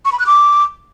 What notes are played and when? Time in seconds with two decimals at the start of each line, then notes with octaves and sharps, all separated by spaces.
0.05 C#6
0.12 B5
0.19 F#6
0.26 D6